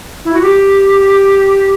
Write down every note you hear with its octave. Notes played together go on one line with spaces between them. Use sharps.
E4
F#4
G4